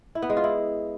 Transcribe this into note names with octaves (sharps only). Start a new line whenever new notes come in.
E4
B3
G#3
F4
E4